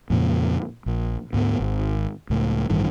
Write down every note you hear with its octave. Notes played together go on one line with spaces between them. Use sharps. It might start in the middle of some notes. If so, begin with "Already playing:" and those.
F2 A#2 C#3
A#1
D2 G#2 B3
G#1
C#2 A2
A1 G2 D#3 E3